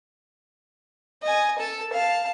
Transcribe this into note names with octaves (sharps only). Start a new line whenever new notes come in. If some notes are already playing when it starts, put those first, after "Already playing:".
D#5 G#5
A4 A5
F5 A5